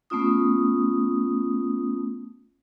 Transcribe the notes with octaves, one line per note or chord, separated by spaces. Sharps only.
A3 B3 C#4 F4 D#6